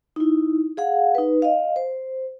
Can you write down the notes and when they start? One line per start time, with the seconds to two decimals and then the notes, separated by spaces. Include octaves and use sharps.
0.16 D#4 E4
0.77 G#4 F5 F#5
1.15 D#4 B4
1.42 D#5 F5
1.76 C5